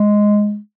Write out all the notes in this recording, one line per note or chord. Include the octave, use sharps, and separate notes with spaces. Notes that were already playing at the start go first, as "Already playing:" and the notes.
Already playing: G#3